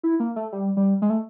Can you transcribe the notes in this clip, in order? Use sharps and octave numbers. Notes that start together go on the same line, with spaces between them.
E4
A#3
A3
G3
G3
G#3
A3